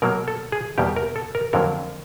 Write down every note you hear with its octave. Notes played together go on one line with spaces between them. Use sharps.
B2 F#3 A#3 A#4
A4
G#4
E2 B2 G3 A#3 G4
A#4
A4
A#4
F2 D3 F#3 A#3 A#4